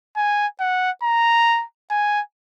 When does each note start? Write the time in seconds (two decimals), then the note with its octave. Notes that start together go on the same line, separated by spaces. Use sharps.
0.16 G#5
0.60 F#5
1.03 A#5
1.90 G#5